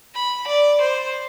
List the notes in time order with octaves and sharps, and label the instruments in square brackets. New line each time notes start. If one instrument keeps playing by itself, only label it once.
[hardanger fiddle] B5
D5
C5